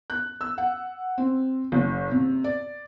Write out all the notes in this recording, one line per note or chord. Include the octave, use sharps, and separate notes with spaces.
F#6
E6
F#5
C4
F#1
C3
D5